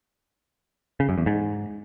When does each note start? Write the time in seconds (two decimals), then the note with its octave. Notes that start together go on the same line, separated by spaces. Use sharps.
1.00 C#3
1.09 F#2
1.18 E2
1.26 G#2